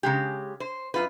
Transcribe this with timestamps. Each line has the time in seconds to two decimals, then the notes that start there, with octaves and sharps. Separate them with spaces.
0.03 C#3 G#3 G4
0.60 C5
0.94 F#2 F4 B4